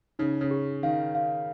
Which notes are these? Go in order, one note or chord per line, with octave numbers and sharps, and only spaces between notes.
C#3 D#4
C#3
G#4
D#3 F5
F5